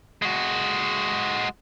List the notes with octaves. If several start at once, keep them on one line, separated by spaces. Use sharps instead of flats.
G#3 F#4